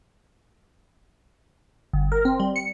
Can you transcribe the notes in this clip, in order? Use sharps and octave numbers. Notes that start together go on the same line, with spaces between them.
G1
A#4
C4
G3
C#7